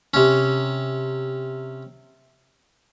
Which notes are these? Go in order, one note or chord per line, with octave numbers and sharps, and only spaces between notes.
C3 C#4